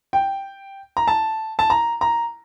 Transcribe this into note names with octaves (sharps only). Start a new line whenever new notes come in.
G5
A#5
A5
A5
A#5
A#5